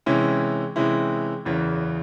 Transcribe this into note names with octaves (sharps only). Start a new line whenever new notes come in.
C3 E3 G#3 C#4 E4
C3 E3 G#3 C#4 E4
F#1 E2 C#3 E3